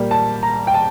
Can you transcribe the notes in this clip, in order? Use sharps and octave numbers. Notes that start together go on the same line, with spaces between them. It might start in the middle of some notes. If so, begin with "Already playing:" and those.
Already playing: A#2 G3 A#3
A5
A#5
G5
A5